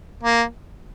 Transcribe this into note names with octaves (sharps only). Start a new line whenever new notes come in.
A#3